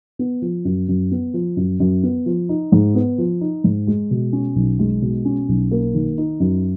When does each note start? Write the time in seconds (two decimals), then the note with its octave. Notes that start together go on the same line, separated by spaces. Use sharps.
0.19 B3
0.42 F3
0.65 F#2
0.89 F#2
1.11 B3
1.34 F3
1.57 F#2
1.80 F#2
2.03 B3
2.26 F3
2.49 D#4
2.72 G#2
2.95 B3
3.18 F3
3.41 D#4
3.64 G#2
3.87 G#3
4.11 B2
4.33 C#4
4.56 B1
4.79 G#3
5.02 B2
5.25 C#4
5.49 B1
5.71 A#3
5.94 D#3
6.18 D#4
6.40 F#2